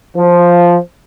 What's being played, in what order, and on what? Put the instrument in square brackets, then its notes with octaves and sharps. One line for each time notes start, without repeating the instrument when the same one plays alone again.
[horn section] F3